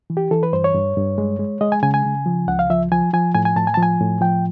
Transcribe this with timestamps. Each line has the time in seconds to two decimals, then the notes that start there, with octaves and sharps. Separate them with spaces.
0.10 E3
0.17 G4
0.31 E3 A4
0.43 B4
0.53 G2 C5
0.64 C#5
0.75 G2
0.97 G2
1.18 G#3
1.39 G#3
1.61 G#3 D#5
1.72 G#5
1.83 C#3 G#5
1.94 G#5
2.05 C#3
2.26 F3
2.48 C#2 F#5
2.59 F5
2.70 F3 E5
2.92 F3 G#5
3.13 F3 G#5
3.35 A2 G#5
3.45 G#5
3.56 A2 A5
3.67 G#5
3.74 A5
3.77 F3
3.83 G#5
4.00 A2
4.21 F3 G5